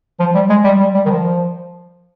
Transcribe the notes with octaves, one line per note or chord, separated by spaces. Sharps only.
F3
G3
G#3
G3
G3
G3
D#3
F3